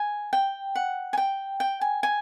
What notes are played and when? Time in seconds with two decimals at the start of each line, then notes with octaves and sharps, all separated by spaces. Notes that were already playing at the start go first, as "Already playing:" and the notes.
Already playing: G#5
0.33 G5
0.75 F#5
1.13 G#5
1.18 G5
1.60 G5
1.81 G#5
2.03 G#5